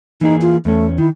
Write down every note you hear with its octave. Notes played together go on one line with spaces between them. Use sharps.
E3 A#3 D#4 G#4
F4
E2 A3 C#4
D#3 E4